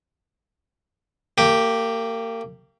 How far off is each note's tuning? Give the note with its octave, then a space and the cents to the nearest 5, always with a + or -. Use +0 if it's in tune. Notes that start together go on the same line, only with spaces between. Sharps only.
A#3 -35 G4 +0